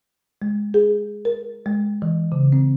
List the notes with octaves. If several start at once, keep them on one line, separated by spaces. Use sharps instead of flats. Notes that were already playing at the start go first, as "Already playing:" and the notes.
G#3
G#4
A#4
G#3
E3
C#3
C4